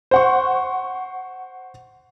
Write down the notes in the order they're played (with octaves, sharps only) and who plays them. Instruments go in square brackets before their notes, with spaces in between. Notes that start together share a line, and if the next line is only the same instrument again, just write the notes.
[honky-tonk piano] C5 F#5 C#6